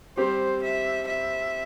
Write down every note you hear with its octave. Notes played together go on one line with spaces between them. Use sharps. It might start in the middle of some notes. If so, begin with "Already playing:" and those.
G3 C4 G4 C5
E5
E5